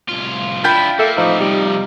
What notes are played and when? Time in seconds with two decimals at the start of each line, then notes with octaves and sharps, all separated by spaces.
0.09 C2 F4
0.64 D4 E4 F4 G5 B5
0.99 A#3 A4 E5
1.17 A2 E3 F3 D#4
1.41 C3 F3 G3